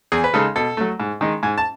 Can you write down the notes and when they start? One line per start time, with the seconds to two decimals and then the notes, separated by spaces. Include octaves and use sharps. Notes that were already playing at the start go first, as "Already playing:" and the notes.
0.12 E2 G#4
0.24 B4
0.34 C#3 G#3 D#4 A4
0.56 B2 A4
0.77 F#3 A3
1.00 G#2
1.21 D#3 G#3 D#4
1.43 G#2 G#5
1.58 A5